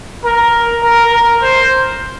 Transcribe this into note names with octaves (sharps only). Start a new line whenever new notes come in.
A#4
A#4
A#4
C5